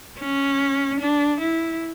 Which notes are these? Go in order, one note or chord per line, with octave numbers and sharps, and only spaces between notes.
C#4
D4
E4